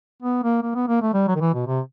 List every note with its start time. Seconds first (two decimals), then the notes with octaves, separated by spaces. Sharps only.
0.23 B3
0.43 A#3
0.63 A#3
0.75 B3
0.88 A#3
1.01 A3
1.14 G3
1.28 F#3
1.35 D#3
1.41 E3
1.54 B2
1.67 C3